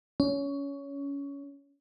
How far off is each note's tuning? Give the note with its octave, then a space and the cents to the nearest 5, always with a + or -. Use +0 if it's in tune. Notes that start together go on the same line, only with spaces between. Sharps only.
C#4 +20